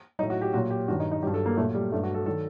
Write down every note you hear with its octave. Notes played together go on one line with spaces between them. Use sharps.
A2 F#3 D#4
F#4
G4
A#2 F#3 F#4
G4
G2 D#3 F#3 F#4
D#4
D#4
G2 F#3 G4
A4
A#3
A#2 F#3 A3
G3
G2 F#3 A3
F#4
A4
D#3 F#3 A4